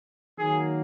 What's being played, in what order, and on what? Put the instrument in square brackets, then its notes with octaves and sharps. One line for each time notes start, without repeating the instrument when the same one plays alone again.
[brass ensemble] D#3 F#3 A#3 [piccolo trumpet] G#4